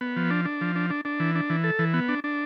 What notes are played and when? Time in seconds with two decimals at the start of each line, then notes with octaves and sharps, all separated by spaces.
0.01 B3
0.16 F3
0.30 D4
0.45 D4
0.61 F3
0.76 D4
0.90 D4
1.05 D4
1.20 E3
1.35 D4
1.50 E3
1.64 A4
1.79 E3
1.94 B3
2.09 D4
2.24 D4